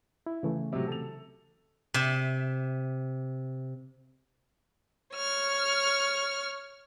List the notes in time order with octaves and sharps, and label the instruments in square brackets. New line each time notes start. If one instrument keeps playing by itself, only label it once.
[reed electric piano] E4
C#3 E3 A3
[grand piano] C3 F#3
A4 F7
[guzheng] C3 E5
[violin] C#5 F6